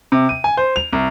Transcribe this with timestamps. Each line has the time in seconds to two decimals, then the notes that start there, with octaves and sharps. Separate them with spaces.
0.12 C3
0.29 D#7
0.44 G#5
0.57 C5
0.76 F7
0.93 C2